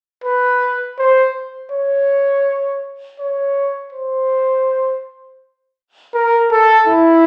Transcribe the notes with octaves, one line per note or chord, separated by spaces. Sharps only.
B4
C5
C#5
C#5
C5
A#4
A4
E4